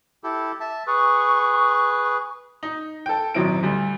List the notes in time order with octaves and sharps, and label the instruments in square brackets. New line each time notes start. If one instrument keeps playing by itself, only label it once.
[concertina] E4 G4 A4
E5 A5
[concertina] G#4 B4 [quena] C#6
[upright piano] D#4
A4 G5
D#1 G#1 F#3 C4 E4 D7
D2 G3